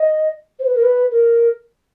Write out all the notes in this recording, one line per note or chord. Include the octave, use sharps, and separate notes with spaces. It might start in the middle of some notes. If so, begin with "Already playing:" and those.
Already playing: D#5
C5
B4
A#4
B4
A#4